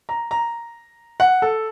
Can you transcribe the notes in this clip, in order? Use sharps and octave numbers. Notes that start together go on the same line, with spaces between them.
A#5
A#5
F#5
A4